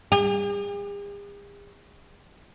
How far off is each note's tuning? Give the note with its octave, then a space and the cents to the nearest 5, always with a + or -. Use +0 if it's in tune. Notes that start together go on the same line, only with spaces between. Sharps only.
G#4 -45